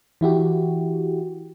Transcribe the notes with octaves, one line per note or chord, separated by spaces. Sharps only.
E3 E4 F#4 G4